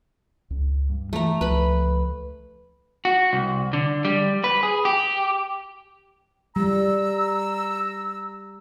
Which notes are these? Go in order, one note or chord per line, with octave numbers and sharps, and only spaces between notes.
C#2
G2
E3 A3 A#5
C#2 F3 B4 B5
F#4
C2
D3
G3
B4
G#4
G4
G3 A#5 E6